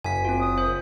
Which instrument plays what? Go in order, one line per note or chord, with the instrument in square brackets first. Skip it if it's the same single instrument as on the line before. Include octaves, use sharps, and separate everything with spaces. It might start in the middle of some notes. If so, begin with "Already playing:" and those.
[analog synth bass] F#1 [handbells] G#5 B6
[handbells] C4 F4
[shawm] D#6
[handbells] C5